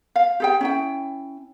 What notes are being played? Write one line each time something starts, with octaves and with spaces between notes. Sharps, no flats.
F5
G4 G#4 G5
C#4 E4 G5